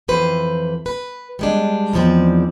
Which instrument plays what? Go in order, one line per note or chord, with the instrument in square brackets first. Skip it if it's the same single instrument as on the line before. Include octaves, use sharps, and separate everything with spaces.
[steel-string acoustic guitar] F2 E3 B4 C5
B4
G3 G#3 D4
E2 G#2 F3 C4 D5